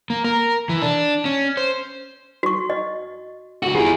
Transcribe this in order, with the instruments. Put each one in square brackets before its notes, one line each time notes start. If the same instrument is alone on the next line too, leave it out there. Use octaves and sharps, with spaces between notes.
[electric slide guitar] A#3
A#4
E3
D4
C#4
C5
[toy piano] F#4 C#6
D#5
[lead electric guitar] C#2 F#4
[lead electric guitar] E4 G#4 [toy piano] F4 G4